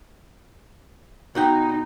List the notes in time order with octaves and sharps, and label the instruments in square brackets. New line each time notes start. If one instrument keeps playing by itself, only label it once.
[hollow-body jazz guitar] B2 F#4 G5 [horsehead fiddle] D#4